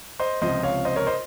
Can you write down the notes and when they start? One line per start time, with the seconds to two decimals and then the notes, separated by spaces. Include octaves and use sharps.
0.20 C5 D#5
0.41 C#2 C3 F3 C5 D#5
0.63 C#5 F5
0.85 C5 D#5
0.96 A#4 C#5
1.07 C5 D#5